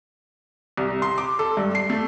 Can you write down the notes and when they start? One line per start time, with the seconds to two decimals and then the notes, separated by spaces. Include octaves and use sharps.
0.77 C2
1.02 C6
1.18 D6
1.39 A4
1.57 G2
1.75 C7
1.90 A3